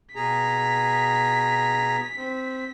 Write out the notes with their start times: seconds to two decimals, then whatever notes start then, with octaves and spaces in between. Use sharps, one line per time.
0.16 B2 G#4 A#5 B6
2.17 C4